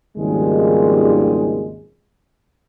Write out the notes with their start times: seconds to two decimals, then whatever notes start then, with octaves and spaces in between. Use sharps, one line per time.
0.18 G#1 D#2 C#3 F3 G3 G#3